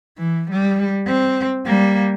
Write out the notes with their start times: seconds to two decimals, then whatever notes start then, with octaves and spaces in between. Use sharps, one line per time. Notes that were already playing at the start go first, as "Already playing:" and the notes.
0.18 E3
0.51 G3
1.07 C4
1.66 G3 A#3